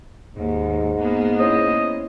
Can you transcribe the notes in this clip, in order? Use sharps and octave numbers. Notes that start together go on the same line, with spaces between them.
D#2 G#2
A#3 B3 G#4
C#4 E4 C5 D#5